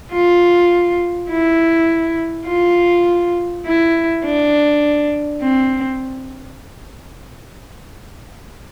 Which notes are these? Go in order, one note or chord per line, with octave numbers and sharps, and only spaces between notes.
F4
E4
F4
E4
D4
C4